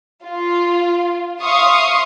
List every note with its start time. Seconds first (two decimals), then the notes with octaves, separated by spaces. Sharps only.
0.25 F4
1.42 E5 F5 C6 C#6 D#6